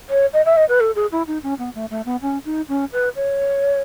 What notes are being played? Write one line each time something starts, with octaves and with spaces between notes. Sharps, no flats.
C#5
D#5
E5
D#5
B4
A4
G#4
E4
D#4
C#4
B3
A3
A3
B3
C#4
D#4
C#4
B4
C#5